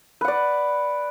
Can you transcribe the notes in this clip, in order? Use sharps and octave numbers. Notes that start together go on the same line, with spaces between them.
B4 D5 F#5